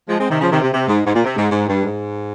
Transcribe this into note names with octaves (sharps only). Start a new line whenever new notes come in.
F3 G#3
G#3 C4
C3 D#3
C#3 F3
C3 D#3
C3
C3
G#2
G#2
A#2
C3
G#2
G#2
G2
G#2